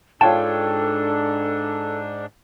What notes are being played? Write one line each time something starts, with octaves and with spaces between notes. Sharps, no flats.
G#2 D4 F4 A4 C#5 G5 A5